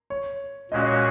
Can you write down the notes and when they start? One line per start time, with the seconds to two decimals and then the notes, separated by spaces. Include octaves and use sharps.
0.10 C#5
0.71 A#2 G#3 C#4 F#4 D#5
0.82 D#5
0.87 C#5